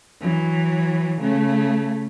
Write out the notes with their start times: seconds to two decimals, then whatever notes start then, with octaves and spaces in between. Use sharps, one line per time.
0.21 E3 F#3
1.20 C#3 A3